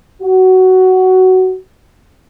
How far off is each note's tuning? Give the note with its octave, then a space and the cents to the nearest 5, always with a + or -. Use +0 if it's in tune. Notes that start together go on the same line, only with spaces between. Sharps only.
F#4 +15